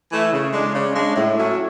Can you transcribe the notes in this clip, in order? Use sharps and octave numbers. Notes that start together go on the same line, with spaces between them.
E3 A3 E4
C#3
G#3 D4
C#3
G#3 D4
A2
F#3 A3 C#4 E4